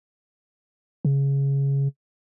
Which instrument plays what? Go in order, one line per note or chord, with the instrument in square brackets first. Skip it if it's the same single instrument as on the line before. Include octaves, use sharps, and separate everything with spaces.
[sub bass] C#3